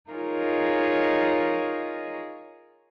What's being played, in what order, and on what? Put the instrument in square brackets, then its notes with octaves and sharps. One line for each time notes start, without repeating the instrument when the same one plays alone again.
[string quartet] D#4 F4 G#4 A#4 C#5 D#5